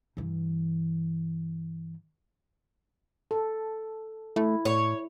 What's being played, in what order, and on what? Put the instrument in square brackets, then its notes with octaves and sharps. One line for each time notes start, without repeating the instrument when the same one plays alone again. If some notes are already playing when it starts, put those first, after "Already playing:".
[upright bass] G2 E3
[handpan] A4
[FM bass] A3 [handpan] E4
[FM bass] A2 [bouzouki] C#5